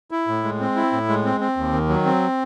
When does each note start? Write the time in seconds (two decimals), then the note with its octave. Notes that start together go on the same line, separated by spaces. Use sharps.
0.11 E4
0.28 A2
0.44 G#3
0.60 C4
0.76 E4
0.93 A2
1.09 G#3
1.25 C4
1.40 C4
1.57 D#2
1.73 D#3
1.89 F#3
2.05 C4